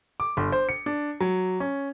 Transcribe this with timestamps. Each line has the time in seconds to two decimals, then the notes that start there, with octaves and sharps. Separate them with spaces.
0.20 D6
0.37 G1
0.52 C5
0.69 C#7
0.86 D4
1.20 F#3
1.60 C#4